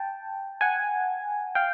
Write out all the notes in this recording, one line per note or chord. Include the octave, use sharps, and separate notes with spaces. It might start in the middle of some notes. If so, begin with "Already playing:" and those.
Already playing: G5 A5
F#5 G#5
F5 G5